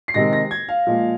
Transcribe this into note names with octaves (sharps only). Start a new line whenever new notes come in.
C7
C3 D#3 G#3 A#6
A#6
G#6
F5
A#2 F3 G#3